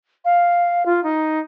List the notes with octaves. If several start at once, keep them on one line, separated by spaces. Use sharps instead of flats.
F5
F4
D#4